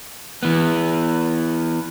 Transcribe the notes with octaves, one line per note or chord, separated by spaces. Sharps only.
E3 B3